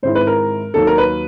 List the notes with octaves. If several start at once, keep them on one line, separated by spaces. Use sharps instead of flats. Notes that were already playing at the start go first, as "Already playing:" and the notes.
G#2 D#3 G#3 C4 E4 C5
B4
A#4
D#2 D#3 F#3 A4
A#4
B4